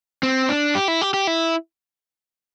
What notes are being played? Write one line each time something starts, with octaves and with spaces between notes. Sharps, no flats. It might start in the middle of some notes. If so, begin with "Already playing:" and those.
C4
D4
G4
E4
G4
G4
E4